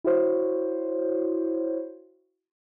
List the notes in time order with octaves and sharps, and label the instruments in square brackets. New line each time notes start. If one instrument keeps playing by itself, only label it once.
[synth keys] E4 F#4 C5 C#5